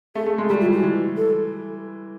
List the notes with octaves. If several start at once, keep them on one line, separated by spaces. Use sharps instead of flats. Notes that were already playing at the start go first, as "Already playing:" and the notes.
A3 G#4
A3
G#3
G3 G4
F4
E3
F#4
E3
A4